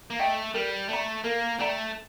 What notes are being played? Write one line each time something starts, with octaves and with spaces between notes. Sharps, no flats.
A#3
A3 D#5 G5
G3 A#4
A3 D5 G5 A#5
A#3 A#4
A3 D5 G5 A#5